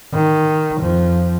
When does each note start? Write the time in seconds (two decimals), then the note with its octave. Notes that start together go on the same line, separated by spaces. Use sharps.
0.14 D#3
0.79 F2 F3